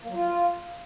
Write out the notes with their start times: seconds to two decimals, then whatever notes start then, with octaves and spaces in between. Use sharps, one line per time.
0.02 A#3
0.08 F#3
0.14 F4